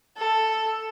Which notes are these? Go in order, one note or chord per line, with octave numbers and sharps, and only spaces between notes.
A4